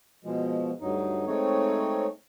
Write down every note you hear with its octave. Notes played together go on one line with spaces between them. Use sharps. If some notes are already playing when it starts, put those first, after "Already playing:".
B2 F3 G#3
D2 G2 F#3 D#4
G#3 A3 C4 D#4 C#5